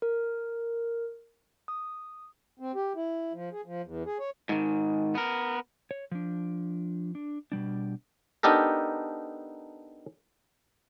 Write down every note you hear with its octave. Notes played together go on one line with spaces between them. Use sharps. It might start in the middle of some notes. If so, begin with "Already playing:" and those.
A#4
D#6
C4
G4
E4
F3
G#4
F3
E2
G#4
C#5
G#2 D#3
B3 A#4
C#5
F3 D4
D4
B2 G3 D4
B3 D4 D#4 G4 A4 A#4